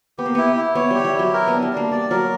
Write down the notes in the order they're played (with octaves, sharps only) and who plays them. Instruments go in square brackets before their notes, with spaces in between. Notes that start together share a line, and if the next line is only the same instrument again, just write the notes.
[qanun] B3 [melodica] G4
[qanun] A#3
[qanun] B3 [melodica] E4
[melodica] E4
[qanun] B3 [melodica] C#5
[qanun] G3 [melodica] G4
[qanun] G3
[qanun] F#3 [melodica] E4
[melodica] A#4
[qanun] B3
[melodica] D4
[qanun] G3
[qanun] A#3 [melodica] D4
[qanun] G3 [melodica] D5
[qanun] F#3 [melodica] A#4